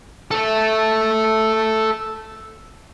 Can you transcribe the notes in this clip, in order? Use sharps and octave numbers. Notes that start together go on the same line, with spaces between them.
A4 E5